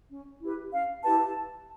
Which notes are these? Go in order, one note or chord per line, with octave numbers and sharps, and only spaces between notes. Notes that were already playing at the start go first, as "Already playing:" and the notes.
C#4
E4 G4 B4
C#4 F5
E4 G4 B4 A5